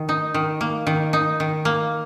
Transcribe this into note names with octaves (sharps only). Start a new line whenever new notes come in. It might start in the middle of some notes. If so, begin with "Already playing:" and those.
Already playing: D#3
D#4
D#3
A#3
D#3
D#4
D#3
A#3